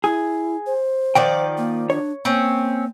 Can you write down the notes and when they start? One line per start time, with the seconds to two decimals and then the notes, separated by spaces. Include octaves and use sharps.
0.04 E4 G#4
0.66 C5
1.15 D#3 F3 D5 F#5 G5
1.58 A#3
1.90 D4 C#5
2.25 A#3 C4 C#4